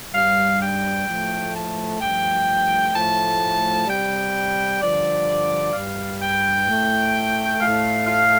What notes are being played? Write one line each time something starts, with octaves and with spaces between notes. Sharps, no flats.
G2 G3 F5
G5
A2 F3 A3
A5
G2 F3 A3 G5
A2 F3 A3 A5
C3 G3 G5
G2 D3 F3 D5
G3 F5
G2
G5
A2 A3
A2 A3 F5
F5